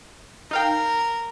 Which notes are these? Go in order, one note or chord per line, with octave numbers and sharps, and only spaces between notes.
D#4 A#4 F5 G5